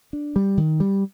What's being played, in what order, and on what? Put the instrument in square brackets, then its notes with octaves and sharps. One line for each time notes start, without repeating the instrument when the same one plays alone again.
[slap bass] D4
G3
D#3
G3